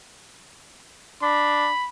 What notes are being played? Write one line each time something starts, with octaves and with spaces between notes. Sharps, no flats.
D4 B5